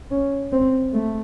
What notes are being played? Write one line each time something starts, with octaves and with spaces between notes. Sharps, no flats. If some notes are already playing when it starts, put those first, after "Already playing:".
C#4
C4
A3